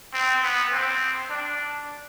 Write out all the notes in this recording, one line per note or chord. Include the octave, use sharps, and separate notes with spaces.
C4
B3
C4
D4